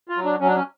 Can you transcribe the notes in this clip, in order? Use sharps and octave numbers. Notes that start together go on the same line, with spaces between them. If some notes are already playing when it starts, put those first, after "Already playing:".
F4
F#3
D4
F#3 C#4
D4
C#4